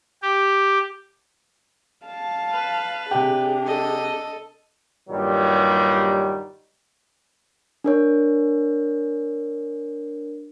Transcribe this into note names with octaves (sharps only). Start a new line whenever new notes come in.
G4
F5 A5
B4
C3 D4 G4 G#4
A4 D#5
G2 A#2 D#3 F#3 G3
D4 A#4 C#5